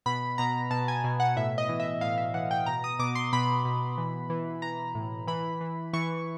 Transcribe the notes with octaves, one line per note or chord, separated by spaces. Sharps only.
B2 B5
B2 A#5
B2 A5
G#5
B2
F#5
A2 E5
D#5
E3
E5
A2 F5
E5
E3 F#5
G5
B2 A#5
D#6
B2 D6
C6
B2 B5
B2
E3
E3
E3 A#5
A2
E3 B5
E3
E3 C#6